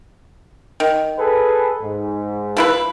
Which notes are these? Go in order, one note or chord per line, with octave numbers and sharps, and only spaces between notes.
D#3
G#4 A4 B4
G#2
F3 E4 B4